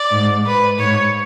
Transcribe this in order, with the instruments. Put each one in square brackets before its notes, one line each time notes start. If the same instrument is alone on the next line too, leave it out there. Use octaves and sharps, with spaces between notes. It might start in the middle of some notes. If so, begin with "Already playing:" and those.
Already playing: [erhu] D5
[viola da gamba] G#2
[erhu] B4
[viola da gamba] G#2 [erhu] C#5